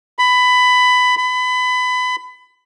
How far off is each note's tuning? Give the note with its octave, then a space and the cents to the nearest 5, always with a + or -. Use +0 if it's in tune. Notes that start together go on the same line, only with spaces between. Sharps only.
B5 +15
B5 +25